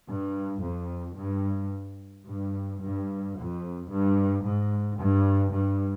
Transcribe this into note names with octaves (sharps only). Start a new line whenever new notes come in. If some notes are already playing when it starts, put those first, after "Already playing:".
G2
F2
G2
G2
G2
F2
G2
G#2
G2
G2